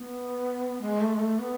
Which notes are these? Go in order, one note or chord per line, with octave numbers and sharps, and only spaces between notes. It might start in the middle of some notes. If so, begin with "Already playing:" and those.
Already playing: B3
G#3
A3
G#3
A3
B3